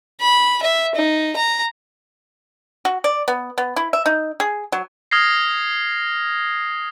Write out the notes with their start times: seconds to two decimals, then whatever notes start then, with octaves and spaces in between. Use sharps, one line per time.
0.21 B5
0.63 E5
0.95 D#4
1.36 A#5
2.85 F#4
3.04 D5
3.28 B3
3.58 B3
3.76 E4
3.93 E5
4.06 D#4
4.40 G#4
4.72 F#3
5.11 D#6 F6 G#6 A#6 C7